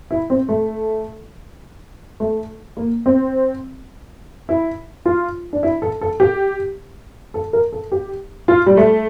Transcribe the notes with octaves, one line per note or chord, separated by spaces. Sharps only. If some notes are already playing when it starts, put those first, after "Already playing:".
E4
C4
A3
A3
A#3
C4
E4
F4
D4
E4
A4
A4
G4
A4
A#4
A4
G4
F4
G3
A3